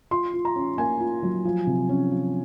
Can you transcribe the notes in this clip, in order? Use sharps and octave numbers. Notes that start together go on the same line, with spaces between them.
F4 C6
F4
A#5
C#4
A#3 G#5
F4
F#3
F3
C3
C#4
F3